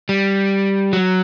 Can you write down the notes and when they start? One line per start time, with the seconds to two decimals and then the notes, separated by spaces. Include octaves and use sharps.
0.09 G3
0.93 F#3